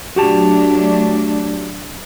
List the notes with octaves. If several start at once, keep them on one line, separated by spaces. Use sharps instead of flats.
F#3 A3 D4 F#4 G4 A5